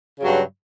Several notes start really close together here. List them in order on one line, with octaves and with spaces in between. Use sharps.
C#3 F#3 G2